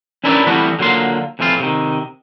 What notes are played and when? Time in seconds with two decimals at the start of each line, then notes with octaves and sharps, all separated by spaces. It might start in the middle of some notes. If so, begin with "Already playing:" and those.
0.24 C#4 D4 E4 A#4 B4 D5
0.47 E3 G3 A3 B3 C4 F#4
0.79 D3 F#3 A#3 F4 C6
1.39 F2 A2 E3 C4 F4
1.60 C3 D#3